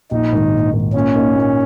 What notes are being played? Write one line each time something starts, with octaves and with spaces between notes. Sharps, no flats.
A#1 D#4
G#2 D#3
A#1
G#2 D#3
A#2 C#4
A#3 D#4
A#2